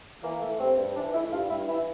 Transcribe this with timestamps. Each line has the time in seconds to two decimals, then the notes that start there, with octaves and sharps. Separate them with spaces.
0.23 E3 A#3
0.41 A3
0.59 G2 C4
0.77 G2
0.96 E3 D4
1.14 A3 E4
1.31 G2 F4
1.49 G2 E4
1.67 E3 E4